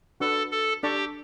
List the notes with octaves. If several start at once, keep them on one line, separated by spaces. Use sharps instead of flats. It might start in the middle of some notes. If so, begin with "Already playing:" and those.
D4 F#4 A4 B4
A4
D4 G4 A4 D5 A5 C#6